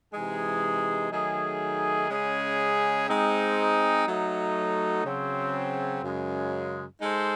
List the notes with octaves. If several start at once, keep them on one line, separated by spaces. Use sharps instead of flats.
C3 E3 G#3 D#4 G#4
D#3 F#3 A3 D#4 G#4
C#3 G#3 C#4 G#4
G#3 C4 D#4
F#3 A3 D#4
C#3 F#3 C4
F#2 C#3 G#3
G#3 D#4 A4 C5